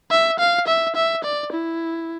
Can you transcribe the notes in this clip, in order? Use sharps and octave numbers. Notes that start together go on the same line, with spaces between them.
E5
F5
E5
E5
D5
E4